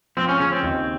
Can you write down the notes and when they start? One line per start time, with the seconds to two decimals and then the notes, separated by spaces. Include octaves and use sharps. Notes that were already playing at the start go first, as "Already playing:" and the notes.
0.17 F3 C4
0.28 C#4
0.40 C#3 C#4
0.52 C4
0.63 D#2